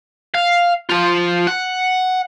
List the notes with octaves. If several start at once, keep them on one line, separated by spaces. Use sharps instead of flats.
F5
F3 F4
F#5